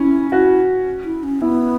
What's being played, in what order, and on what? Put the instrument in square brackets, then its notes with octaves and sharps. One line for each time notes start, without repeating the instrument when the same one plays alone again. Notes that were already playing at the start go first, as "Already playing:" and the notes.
Already playing: [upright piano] C#4 [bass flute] E4
[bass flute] E4 [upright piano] F#4
[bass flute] E4
C#4
[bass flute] B3 [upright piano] E4